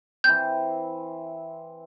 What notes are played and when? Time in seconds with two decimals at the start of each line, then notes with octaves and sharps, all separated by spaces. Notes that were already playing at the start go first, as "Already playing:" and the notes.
0.24 E3 C4 G6